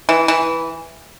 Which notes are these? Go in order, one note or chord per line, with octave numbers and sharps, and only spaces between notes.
E3
E3